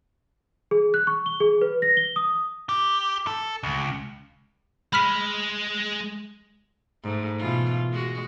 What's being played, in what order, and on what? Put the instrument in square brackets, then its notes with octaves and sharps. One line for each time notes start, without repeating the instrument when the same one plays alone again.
[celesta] G#4
F#6
C#6
G7
G#4
B4
A#6
G7
D#6
[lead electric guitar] G4
A4
C#2
[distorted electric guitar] G#3 [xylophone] B5 F6 B6
[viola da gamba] G#2 A3
B2 E3 F4
G#3 F#4